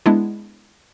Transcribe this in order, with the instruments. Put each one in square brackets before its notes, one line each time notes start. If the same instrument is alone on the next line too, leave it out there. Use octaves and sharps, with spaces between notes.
[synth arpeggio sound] G#3 B3 D4 E4